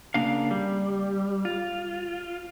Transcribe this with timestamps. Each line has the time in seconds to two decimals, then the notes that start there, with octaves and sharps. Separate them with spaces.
0.14 C#3 A#3 D4 F5
0.51 G3
1.45 F4